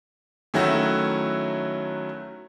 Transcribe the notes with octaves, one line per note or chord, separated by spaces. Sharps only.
D#3 F#3 A3 C#4 E4 F#4